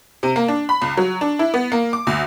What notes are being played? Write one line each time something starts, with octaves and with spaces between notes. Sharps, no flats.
C3
A#3
D4
B5
C#2
F#3
D4
E4
B3
A#3
D6
D2